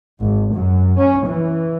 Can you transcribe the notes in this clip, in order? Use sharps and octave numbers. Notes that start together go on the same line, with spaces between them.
G#1
F#2
C#4
E3